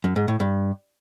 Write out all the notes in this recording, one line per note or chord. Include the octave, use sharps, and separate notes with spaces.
F#2
G#2
A2
G2